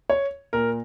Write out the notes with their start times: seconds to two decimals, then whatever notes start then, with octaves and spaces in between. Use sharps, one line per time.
0.10 C#5
0.53 A#2 A#4